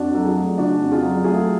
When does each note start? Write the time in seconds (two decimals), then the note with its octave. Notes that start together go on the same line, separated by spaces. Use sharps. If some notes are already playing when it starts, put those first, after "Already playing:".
Already playing: F2 D4 F#4
0.14 F#3 A4
0.25 F4 G#4
0.37 A3
0.58 C#3 D4 F#4
0.81 F2
0.92 F4 G#4
1.03 F#3
1.24 A3 F4 G#4